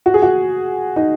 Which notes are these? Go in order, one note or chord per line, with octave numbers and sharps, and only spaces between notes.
F#4
G#4
F#4
D#4